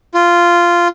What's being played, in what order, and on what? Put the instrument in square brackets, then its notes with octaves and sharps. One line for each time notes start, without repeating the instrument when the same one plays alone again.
[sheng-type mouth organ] F4